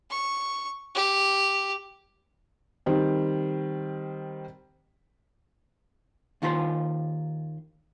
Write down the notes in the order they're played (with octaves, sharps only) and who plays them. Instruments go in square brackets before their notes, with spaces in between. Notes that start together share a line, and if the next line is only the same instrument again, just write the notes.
[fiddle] C#6
G4
[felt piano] D#3 G3 C4
[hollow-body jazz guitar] D#2 D#3 F4 C5 A#5 C6